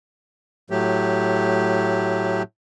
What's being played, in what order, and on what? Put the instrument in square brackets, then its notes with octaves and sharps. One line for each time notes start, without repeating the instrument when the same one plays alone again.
[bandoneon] A2 F#3 A3 G4